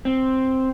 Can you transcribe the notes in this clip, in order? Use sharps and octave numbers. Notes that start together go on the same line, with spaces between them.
C4